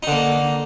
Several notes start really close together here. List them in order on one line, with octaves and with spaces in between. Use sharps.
D#4 D3 A#3